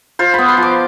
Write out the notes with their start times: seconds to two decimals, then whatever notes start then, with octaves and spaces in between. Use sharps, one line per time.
0.19 F4 C5
0.34 B3 B5
0.48 C6
0.57 F3
0.63 D6